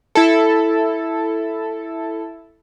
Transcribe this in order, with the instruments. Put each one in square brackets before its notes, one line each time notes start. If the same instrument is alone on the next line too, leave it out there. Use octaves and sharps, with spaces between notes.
[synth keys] E4 A4